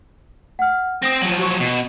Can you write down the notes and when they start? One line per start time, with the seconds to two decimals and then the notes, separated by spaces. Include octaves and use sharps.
0.59 F#5 F6
1.02 C4 D#6 A#6
1.21 F3 F#3 F#7
1.39 F#4 C#6
1.60 B2